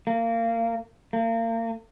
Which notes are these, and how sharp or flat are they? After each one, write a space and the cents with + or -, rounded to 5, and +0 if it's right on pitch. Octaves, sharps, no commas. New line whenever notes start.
A#3 -25
A#3 -35